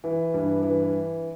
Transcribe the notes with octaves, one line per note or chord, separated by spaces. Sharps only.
E3
G2
E3